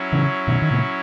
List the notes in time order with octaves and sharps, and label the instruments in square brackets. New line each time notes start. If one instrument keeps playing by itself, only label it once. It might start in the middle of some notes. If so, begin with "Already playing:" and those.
Already playing: [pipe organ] F#3 C#4 E4
[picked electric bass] C#3 E3
B2 D#3
D#3
A#2 C#3